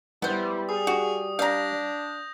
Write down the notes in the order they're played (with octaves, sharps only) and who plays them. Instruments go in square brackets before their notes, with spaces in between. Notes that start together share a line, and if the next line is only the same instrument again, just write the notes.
[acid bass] G3 [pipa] B3 C5 [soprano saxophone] E4
[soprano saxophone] G#4 [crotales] D#6
[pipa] F#4
[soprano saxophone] D4 [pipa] F5 A#5 [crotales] G6 A#6